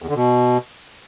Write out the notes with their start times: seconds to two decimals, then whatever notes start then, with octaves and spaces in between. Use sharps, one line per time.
0.02 E2
0.09 D3
0.16 B2